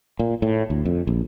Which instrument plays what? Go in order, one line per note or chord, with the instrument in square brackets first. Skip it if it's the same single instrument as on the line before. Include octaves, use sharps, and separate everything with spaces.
[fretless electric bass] A#2
A2
D2
F2
A#1